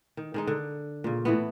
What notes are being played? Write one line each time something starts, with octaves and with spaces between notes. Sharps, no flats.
D#3
D#3 G#3 D#4
D3
A#2 C#3
A2 E3 B3